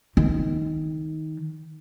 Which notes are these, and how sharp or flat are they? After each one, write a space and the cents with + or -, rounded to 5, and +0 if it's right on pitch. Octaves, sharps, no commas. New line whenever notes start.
D#3 +10